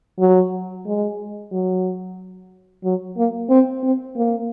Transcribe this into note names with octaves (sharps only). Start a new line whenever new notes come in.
F#3
G#3
F#3
F#3
A#3
C4
C4
A#3